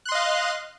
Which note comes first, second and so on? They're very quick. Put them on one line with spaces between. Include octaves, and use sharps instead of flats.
F#6 C6 D#5 F5